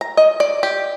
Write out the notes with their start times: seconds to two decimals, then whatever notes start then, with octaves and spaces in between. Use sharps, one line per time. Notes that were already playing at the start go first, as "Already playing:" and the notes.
0.01 A#5
0.17 D#5
0.40 D5
0.63 G4